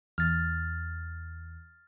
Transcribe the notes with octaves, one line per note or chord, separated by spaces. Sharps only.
E2 F6 A6